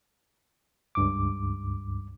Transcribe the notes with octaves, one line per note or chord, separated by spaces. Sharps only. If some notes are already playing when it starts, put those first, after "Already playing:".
C#2 G2 D6